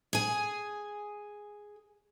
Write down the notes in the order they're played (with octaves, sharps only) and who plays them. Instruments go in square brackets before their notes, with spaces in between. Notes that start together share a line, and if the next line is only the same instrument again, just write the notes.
[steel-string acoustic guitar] G#4 G#5